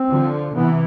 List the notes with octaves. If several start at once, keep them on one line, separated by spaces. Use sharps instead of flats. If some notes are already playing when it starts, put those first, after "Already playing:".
Already playing: C4
D3 F3
C3 E3 B3